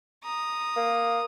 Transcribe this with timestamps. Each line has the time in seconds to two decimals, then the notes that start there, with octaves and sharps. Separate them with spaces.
0.24 A#5 D#6
0.76 A#3